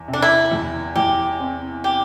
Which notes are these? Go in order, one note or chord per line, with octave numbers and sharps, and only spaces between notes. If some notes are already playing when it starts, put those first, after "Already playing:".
Already playing: E2
C3
D4
E4
E2
E2 G4
C4
G4